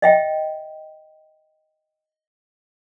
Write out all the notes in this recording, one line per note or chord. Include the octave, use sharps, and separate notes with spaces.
D#5 E5 G5